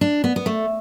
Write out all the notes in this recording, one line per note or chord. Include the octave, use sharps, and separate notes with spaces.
D4
B3
B3
A3